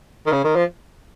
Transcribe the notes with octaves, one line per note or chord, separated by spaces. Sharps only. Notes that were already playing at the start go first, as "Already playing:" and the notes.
D#3
C#3
D#3
F3